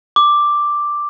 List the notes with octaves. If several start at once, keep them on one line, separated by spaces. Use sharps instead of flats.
D6